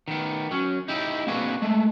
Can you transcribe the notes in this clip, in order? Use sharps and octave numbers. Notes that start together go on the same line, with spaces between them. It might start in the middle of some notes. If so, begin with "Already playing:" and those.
D#3 B3
F#3 C#4
D#4 E4 G4
A#3 C4 D4 F#4 G#4 B4
G#3 A3